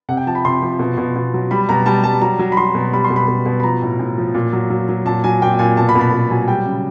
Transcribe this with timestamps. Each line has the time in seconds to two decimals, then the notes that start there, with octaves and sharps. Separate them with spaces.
0.09 C3 F#5
0.17 G5
0.27 F3 A5
0.35 B5
0.45 C3 C6
0.62 F3
0.79 B2
0.98 B2
1.16 B2
1.34 F#3
1.51 G3 B5
1.69 B2 A#5
1.86 G3 A5
2.04 G3 A5
2.22 F#3 A#5
2.39 F#3
2.52 B5
2.57 F#3 C6
2.75 B2
2.93 G3 B5
3.04 C6
3.10 B2
3.16 B5
3.28 B2
3.46 B2
3.60 B5
3.63 F3 A#5
3.82 A2
3.99 A2
4.18 F3
4.34 A#2
4.53 F#3
4.70 F#3
4.89 F#3
5.05 A#2 A5
5.24 F#3 G#5
5.42 A#2 G5
5.54 G5
5.59 A#2 G#5
5.77 B2 A5
5.89 B5
5.95 B2
6.01 B5
6.12 B2
6.30 F#3 G#5
6.47 G3 G5
6.66 C#3